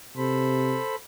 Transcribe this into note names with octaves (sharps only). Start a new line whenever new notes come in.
C3 A4 C5 B5